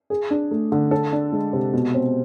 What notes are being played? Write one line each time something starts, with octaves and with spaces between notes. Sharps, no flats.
G#4
D4
A3
D3
A4
D4
G#3
C3
B2
C4